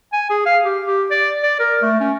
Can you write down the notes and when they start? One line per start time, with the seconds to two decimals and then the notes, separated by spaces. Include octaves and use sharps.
0.13 G#5
0.30 G#4
0.46 F5
0.64 G4
0.85 G4
1.10 D5
1.43 D5
1.60 A#4
1.82 A3
2.00 C#4